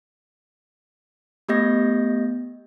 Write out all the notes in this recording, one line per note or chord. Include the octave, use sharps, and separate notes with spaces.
A3 B3 G4 D#5 G6 A#6